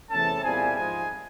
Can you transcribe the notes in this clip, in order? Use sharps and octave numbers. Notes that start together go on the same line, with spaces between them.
E2 C3 E3 A3 C#4 A4 A5
A#2 G3 C4 E4 G#4 G#5
G#2 F3 G#3 G#4 G#5